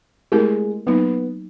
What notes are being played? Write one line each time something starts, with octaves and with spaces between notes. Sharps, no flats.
G#3 A3 C4 E4 G4 A#4
F#3 A#3 B3 D#4